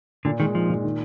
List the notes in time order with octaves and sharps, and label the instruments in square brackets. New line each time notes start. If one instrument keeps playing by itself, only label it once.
[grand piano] A#2 [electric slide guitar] D3
[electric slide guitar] D#3 [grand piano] G#3
[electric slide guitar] F3 [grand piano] D#4
[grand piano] A#2
D#3